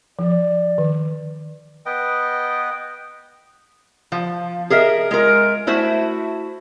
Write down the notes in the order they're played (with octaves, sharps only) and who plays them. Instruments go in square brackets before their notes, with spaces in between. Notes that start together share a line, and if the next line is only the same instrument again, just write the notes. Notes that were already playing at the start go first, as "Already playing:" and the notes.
[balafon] F3 [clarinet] D5
[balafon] D#3
[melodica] B3 B4 D#5 G5
[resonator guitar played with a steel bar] F3
G#4 A#4 D#5 E5
G#3 F4 A#4
A3 E4 F#4 C5 E5